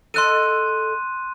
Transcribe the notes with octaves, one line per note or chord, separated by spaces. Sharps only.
A4 D#5 C6 F#6 D#7